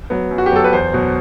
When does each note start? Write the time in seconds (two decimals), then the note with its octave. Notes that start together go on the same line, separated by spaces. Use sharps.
0.10 F#3 B3
0.31 F#2
0.38 F#4
0.46 G4
0.51 F#3 B3 A4
0.64 B4
0.73 E2 C5
0.93 B2 F#3